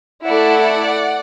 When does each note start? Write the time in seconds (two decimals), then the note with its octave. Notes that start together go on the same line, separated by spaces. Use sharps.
0.24 A3 E4 A4 D5 F#5